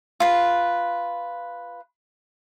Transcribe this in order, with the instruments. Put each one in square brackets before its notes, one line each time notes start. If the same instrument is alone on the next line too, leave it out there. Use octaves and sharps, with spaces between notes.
[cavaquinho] F4 B4